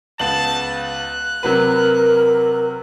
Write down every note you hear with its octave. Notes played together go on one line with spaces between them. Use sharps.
C#2 B3 A5 F#7
F#6
C3 F#3 A#4 B4